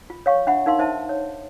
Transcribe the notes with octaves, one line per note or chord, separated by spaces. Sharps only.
F4
C#5 F5 C#6
D4 E5 F#5 B5
D#4 A#4 F5 C6
D#4 C5 E5 A5
C#5